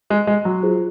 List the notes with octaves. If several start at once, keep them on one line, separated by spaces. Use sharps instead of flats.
G#3
G#3
F#3
F4 G#4 C5